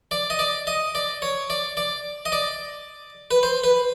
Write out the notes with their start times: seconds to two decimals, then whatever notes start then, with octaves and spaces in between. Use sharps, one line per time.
0.11 D5
0.30 D#5
0.39 D5
0.67 D#5
0.95 D5
1.22 C#5
1.50 D5
1.77 D5
2.25 D#5
2.32 D5
3.31 B4
3.43 C5
3.64 B4